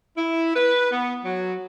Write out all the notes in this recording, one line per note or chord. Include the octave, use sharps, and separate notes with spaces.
E4
B4
B3
F#3